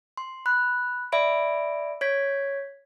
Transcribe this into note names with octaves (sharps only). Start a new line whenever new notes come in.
C6
B5 F#6
D5 E5 B5 D7
C#5 G#6 B6